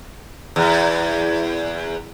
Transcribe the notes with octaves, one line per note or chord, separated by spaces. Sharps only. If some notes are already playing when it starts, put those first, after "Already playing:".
E2